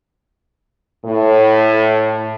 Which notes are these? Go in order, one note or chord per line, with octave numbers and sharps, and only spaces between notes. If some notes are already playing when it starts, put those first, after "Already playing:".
A2